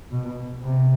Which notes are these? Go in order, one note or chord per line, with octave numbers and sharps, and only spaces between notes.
B2
C3